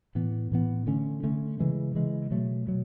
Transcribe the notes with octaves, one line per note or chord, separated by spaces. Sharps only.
A2 E3 B3
A2 E3 B3
D3 A3 C#4
D3 A3 C#4
C#3 E3 G#3
C#3 E3 G#3
B2 F#3 A3
B2 F#3